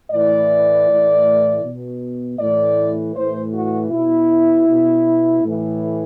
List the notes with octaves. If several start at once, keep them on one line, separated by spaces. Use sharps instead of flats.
A2 E3 D5
A2 E3
B2
A2 E3 D5
A2 E3 C5
F#4
B2 E4
B2
A2 E3